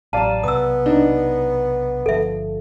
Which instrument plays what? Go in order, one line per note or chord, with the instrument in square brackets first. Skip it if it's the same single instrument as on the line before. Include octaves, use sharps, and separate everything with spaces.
[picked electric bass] A1 F#3 [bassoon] G3 [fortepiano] D5 F5 [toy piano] A5 A#5
[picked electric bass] B1 C3 [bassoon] B3 [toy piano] D#6 E6
[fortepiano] D4 D#4
[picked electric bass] G1 D3 F3 [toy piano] A4 E5